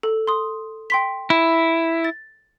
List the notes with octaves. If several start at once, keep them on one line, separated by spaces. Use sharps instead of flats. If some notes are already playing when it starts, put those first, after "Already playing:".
A4
C6 D#6
G5 C6 B6
E4
A6